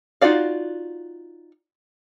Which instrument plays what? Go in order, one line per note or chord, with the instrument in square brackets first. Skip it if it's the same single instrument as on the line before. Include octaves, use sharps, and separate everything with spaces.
[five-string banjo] D#4 F4 F#4 D5 F5